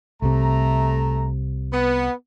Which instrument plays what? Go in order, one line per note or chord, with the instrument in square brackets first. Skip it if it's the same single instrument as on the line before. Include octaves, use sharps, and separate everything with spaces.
[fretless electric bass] C2 C3 [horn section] A3 A#5
[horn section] B3